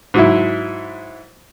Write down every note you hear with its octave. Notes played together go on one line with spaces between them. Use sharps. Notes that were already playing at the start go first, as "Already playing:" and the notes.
G#2 F#3 E4